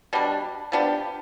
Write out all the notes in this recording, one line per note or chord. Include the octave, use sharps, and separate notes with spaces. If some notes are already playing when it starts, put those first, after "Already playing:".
B2 G3 D4
F3 B3 D4 G4